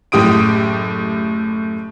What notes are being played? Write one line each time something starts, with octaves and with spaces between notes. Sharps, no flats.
F#1 A2 G4 D#6 D7